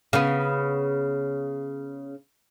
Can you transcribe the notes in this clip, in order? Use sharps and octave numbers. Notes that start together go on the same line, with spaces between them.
C#3 B3